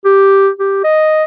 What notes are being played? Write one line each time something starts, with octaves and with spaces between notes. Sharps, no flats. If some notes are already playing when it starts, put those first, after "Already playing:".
G4
G4
D#5